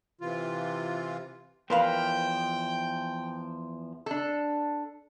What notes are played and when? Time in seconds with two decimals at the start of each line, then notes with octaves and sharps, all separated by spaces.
0.21 C3 E3 F4
1.70 E2 F3 A#4 B4 F5 G5
4.06 D4 A4